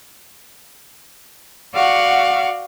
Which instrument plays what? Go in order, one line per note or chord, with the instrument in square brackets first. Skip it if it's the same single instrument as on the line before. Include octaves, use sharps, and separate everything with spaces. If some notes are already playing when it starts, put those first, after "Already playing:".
[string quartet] F#4 D5 F5 F#5 C#6